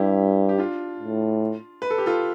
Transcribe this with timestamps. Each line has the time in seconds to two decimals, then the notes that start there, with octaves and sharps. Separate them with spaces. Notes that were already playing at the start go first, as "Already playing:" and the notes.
Already playing: G2 E4 G4
0.49 G4
0.58 D4 F4
1.00 A2
1.82 B4
1.90 A4
1.98 G4
2.06 F4 A4